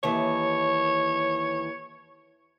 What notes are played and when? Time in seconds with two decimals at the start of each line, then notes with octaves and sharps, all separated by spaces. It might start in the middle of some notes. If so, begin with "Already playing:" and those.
0.03 D#2 E3 C#5